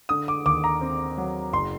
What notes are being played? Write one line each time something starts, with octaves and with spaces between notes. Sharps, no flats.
D3 D#6
D6
D#2 D6
A#5
C4
F#3
F#1 C6